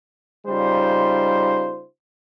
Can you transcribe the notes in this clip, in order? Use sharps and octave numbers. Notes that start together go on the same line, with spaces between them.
C#3 G3 D#4 F4 C5